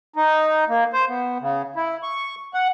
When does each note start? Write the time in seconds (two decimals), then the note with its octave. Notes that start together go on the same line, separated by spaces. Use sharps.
0.16 D#4
0.69 A#3
0.93 C5
1.09 B3
1.41 C#3
1.76 E4
2.03 C#6
2.54 F#5